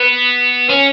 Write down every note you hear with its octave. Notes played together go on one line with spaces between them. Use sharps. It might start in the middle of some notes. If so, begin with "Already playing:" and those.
Already playing: B3
C#4